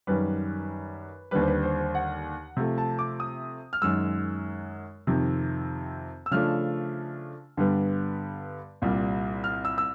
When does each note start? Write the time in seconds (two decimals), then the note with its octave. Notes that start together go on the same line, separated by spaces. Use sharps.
0.07 F#2 D#3 G3 B4
1.31 D#2 D3 G3 B4
1.41 C5
1.48 B4
1.63 C5
1.79 C5
1.95 F#5
2.57 C3 F3 A3
2.78 A5
2.99 D6
3.20 D#6
3.73 F6
3.82 F#2 D#3 G#3 E6
5.07 F2 C3 D#3
6.26 E6
6.31 C#3 F3 A3 D4 F6
7.57 G2 D3 G3 B3
8.82 C2 A#2 G3
9.44 F6
9.65 E6
9.78 E6